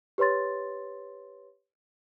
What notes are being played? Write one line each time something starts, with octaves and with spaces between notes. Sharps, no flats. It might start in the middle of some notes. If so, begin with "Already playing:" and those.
G4 B4 C#5 C6 A6